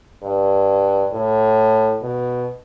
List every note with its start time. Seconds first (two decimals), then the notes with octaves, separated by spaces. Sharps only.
0.23 G2
1.13 A2
2.02 B2